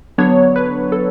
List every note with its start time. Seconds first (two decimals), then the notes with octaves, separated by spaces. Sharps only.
0.18 D3 F#3 B3 D4 C#5
0.56 B4
0.92 A4